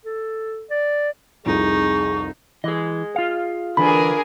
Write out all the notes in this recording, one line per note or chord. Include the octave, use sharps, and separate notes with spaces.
A4
D5
C2 F2 D#4 G#4 C#6
E3 G#4 D#5
F4 F5
D3 E3 D4 G#4 A#4 B5